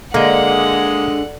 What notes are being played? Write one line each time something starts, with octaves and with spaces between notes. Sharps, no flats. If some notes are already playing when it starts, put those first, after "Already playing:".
D3 G#3 A#3 D#5 F#5